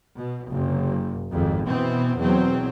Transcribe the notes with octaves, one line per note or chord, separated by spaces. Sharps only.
B2
F#1 C3
G#1 F2
B2 E3 B3 C4
E2 B2 F#3 C4